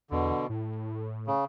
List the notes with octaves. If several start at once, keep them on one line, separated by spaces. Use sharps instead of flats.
E2 B2 D3
A2
C#3